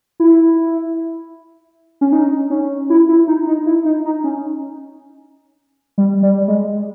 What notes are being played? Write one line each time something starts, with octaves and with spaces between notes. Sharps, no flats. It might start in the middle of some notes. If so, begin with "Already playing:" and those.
E4
C#4
D#4
C#4
E4
E4
D#4
D#4
E4
D#4
D#4
C#4
G3
G3
G#3